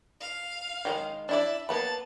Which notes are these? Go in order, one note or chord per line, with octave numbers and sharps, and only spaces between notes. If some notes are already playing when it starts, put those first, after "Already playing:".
F5
D#3 G3 G#3
D4 E4 D5 E5
A#3 B3 A5 B5 A6